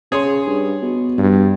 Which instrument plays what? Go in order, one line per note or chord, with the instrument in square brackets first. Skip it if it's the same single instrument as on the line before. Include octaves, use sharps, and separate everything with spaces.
[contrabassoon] C#3 [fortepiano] G#4 C#5 C6
[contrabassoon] G2
B2
[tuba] G2